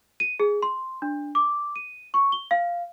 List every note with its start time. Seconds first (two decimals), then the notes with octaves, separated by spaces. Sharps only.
0.20 D#7
0.40 G#4
0.62 C6
1.02 D4
1.35 D6
1.76 D#7
2.14 C#6
2.32 G7
2.51 F5